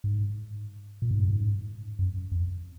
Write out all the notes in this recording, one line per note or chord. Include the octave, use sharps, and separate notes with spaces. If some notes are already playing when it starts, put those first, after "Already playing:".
G#2
A#2
G#2
F#2
G#2
F#2
F2